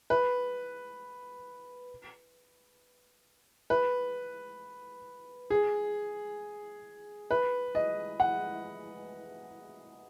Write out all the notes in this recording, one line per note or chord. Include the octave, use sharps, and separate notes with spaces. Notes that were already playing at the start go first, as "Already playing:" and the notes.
B4
B4
G#4
B4
D#5
F#5